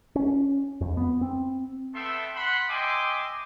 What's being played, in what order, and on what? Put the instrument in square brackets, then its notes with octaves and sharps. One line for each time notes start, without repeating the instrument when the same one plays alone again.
[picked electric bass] C#4
F2
B3
C4
[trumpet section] A3 B3 A4 E5 G5 C6
F#5 B5 C6
D#5 E5 G5 G#5 C6 D6